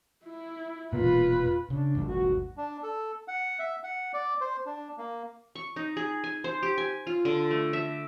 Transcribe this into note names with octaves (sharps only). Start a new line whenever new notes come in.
E4
E1 A#2 F4 B4
C#3 D4
G#1 D#2 G3
F#4
D4
A4
F#5
E5
F#5
D5
C5
D4
A#3
C#6
D#4
G#4
G#5
C5
G4
G#5
F4
D3
A3
E5